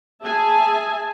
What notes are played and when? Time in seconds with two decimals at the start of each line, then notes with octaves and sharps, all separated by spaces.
0.23 G#4 E5 G#5 A5